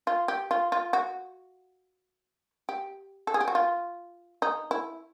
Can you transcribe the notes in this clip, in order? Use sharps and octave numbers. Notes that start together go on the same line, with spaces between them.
F4
G4
F4
F4
F#4
G4
A4
G#4
G4
F#4
F4
D#4
E4